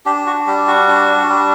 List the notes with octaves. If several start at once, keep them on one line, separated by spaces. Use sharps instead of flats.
D4 G4
F#4
G3 G4
F#4
D4
G3